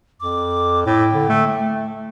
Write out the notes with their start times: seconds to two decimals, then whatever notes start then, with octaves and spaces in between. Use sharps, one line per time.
0.20 F2 D6
0.86 A2 G5
1.14 D3
1.29 A3
1.47 A3